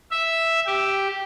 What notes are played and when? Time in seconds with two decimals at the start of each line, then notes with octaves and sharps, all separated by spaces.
0.11 E5
0.67 G4